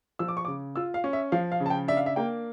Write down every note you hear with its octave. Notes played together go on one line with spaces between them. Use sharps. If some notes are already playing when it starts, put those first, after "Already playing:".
F3 E6
D6
C#6
C#3 D6
F4 E6
F5
C#4
E5
F3 F5
F5
C#3
A5
G5
D4 E5
F5
E5
A#3 G5